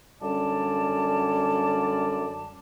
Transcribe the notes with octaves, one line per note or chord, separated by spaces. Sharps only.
F#2 D3 G3 C#4 D5 A5